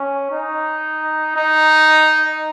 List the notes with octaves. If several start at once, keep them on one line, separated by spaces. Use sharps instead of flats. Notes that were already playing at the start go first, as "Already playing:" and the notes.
Already playing: C#4
D#4
D#4